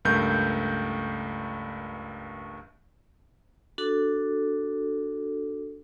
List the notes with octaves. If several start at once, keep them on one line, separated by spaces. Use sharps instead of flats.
C#2 G2 A3 A#4 G6
D4 F#4 A4